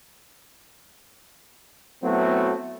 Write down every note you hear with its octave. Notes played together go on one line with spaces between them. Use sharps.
F#3 A3 B3 C4 E4 F#4